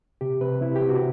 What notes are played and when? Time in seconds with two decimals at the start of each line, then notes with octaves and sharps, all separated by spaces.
0.21 C3 G4
0.41 C3 B4
0.61 C3 E4
0.76 G4
0.82 C3
0.89 F#4